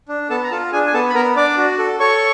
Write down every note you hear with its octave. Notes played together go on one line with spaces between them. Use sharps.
D4
B3 A4 A5
A#5
F4 A4 A5
D4 G#4 G#5
G#5
B3 A4 A5
B5
B3 A#4 A#5
D4 D5 D6
F#4
A4
A4 C#5 C#6